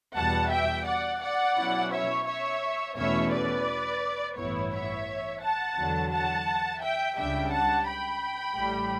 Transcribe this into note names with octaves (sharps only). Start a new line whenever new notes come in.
E2 B2 G3 F#5 A5
E5 G5
D5 F#5
D5 F#5
B2 F#3 C#4 E4
C#5 E5
C#5 E5
E2 B2 A3 C#4 E4 C#5 E5
B4 D5
A1 G2 E3 B3 E4 C#5
C#5 E5
F#5 A5
E2 D3 F#3
F#5 A5
E5 G5
C#2 C#3 G3 D4 E5 G5
F#5 A5
G5 B5
A1 A2 G3